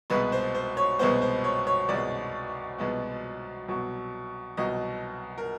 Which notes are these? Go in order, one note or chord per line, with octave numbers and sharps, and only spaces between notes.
C2 B2 G#3 B3 B4
C5
C5
C#5
C2 B2 G#3 B3 C5
C5
C#5
C#5
C2 B2 G#3 B3 D5
C2 B2 G#3 B3
C2 B2 F#3
C2 B2 F#3 D#5
A#4